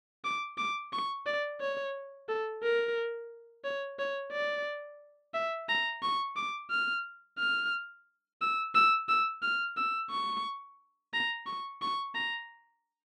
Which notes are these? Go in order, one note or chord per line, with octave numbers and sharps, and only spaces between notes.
D6
D6
C#6
D5
C#5
A4
A#4
C#5
C#5
D5
E5
A#5
C#6
D6
F6
F6
E6
E6
E6
F6
E6
C#6
A#5
C#6
C#6
A#5